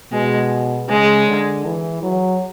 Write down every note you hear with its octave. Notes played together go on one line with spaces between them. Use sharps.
B2 G#3
C#3 G#3
D3
E3
F#3